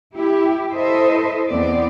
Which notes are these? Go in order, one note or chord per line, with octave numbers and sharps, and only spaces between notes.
E4 G4
E4 A4 C5 D#5 E5
E2 B3 C4 D5